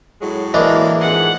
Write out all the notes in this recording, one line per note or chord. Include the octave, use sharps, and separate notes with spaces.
A2 F#3 G#3
E3 A#3 D4 A#4 D#5
F2 G#2 G#3 F#5